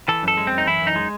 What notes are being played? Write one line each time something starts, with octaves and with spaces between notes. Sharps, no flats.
E3 A4
F#2 A4
G#3
F#2 C4
D#4
E3 E4
F#2
D#4
G#3